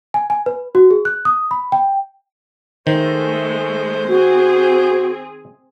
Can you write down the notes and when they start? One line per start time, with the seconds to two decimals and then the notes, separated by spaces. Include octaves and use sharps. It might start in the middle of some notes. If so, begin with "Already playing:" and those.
0.14 G#5
0.30 G#5
0.46 B4
0.75 F#4
0.91 G#4
1.05 F#6
1.25 D#6
1.51 B5
1.72 G5
2.87 D#3 G#3 A3 C5
4.08 C4 F#4 G#4